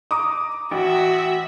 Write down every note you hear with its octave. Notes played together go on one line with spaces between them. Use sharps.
A#5 D6 D#6
A1 F#4 E5